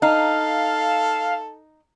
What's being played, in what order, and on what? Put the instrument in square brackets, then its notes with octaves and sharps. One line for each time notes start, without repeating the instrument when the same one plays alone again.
[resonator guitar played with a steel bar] D#4 [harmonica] A4 [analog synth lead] F5